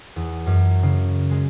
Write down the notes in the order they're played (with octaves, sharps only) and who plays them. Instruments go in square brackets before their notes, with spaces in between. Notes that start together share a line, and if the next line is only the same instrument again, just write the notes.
[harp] E2
F#2
C#3
G#3